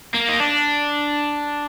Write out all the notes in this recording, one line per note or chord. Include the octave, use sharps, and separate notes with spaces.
A#3
D#4
D4